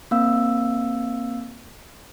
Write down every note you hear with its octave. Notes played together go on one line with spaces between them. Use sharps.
A#3 C4 F5 E6